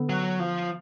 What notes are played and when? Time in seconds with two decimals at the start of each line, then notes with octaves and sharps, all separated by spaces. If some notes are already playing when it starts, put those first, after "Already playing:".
Already playing: D3 B3
0.09 F#3
0.40 F3